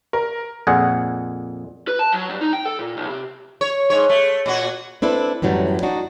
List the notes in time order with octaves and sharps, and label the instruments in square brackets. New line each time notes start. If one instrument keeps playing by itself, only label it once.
[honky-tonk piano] A#4
[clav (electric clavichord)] F2 A#2 G#4 F#5
[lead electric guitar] B4
A5
F#3
G2
D#4
G5
A4
A#2
B1
C3
[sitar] C#5
G#2 C#5
A3
A#2 F#4
[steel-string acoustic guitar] C4 D4 E4 A4 B4
F#2 A2 E3 F#3 G3
D4 D#4 F#4